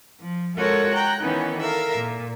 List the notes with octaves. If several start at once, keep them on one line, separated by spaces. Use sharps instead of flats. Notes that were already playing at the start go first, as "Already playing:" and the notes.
F3
G#3 F4 F#4 A4 A#4 C#5
G5 A#5 F#6
D#3 E3 B3 C#4 D#4
A4 A#4 E5 F5
A#2